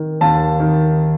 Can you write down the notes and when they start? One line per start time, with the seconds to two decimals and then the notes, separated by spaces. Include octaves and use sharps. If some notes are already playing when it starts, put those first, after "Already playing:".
Already playing: D#3
0.21 D#2 A5
0.60 D#3